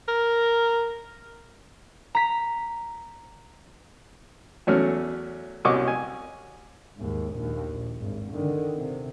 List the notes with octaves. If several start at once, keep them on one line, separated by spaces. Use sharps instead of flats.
A#4
A#5 B6
E2 F#3 A3 C#4 F6
C2 B2 C#4 D#5 C#6 D6
G#5
D#2 G#2
A#1 D#2
A#1
G#1 G2
D3 D#3
C3